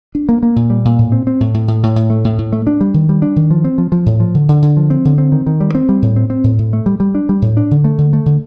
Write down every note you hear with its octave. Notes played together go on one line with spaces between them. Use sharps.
D4
A#3
A#3
A#2
G3
A#2
A2
C4
C4
A2
A2
A2
A2
A2
A3
A2
A2
A3
D4
G3
D#3
G3
D4
D#3
F3
C4
F3
F3
A2
F3
D3
D3
D3
F3
C4
D3
C4
D#3
D#3
G3
C4
G3
A2
C4
C4
A2
A2
A3
G3
G3
D4
G3
A2
D4
D3
A3
D3
A3
D3